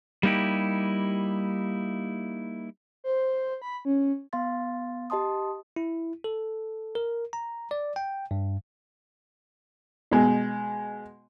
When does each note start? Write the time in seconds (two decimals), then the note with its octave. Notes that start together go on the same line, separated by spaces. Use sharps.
0.23 G3 A#3 D#4 E4 G4
3.04 C5
3.62 B5
3.85 C#4
4.33 B3 F5 C6 A6
5.10 G4 D#5 A5 C6 D#6
5.76 E4
6.24 A4
6.95 A#4
7.33 A#5
7.71 D5
7.96 G5
8.31 G2
10.11 B2 G#3